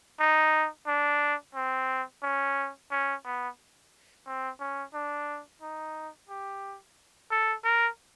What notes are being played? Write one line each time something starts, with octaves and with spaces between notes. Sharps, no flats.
D#4
D4
C4
C#4
C#4
B3
C4
C#4
D4
D#4
G4
A4
A#4